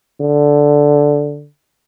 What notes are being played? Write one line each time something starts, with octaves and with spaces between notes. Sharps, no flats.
D3